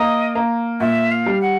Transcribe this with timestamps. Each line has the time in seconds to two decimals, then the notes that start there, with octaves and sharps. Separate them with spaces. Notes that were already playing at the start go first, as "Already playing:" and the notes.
Already playing: A#3 D#5
0.35 A#3
0.80 A#2 E5
1.11 F5
1.26 G3
1.41 F#5